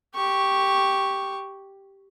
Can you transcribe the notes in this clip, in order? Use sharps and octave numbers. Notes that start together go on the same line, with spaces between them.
G4 C#6